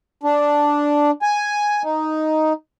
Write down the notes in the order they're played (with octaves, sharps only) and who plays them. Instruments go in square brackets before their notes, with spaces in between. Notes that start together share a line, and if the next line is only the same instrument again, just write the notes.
[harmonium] D4
G#5
D#4